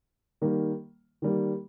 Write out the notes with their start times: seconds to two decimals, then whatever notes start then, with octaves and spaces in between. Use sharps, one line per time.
0.42 D#3 G3 A#3
1.22 D#3 G3 A#3